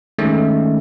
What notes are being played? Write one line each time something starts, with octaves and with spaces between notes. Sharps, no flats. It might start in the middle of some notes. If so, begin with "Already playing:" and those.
D#3 G#3 A3 C#4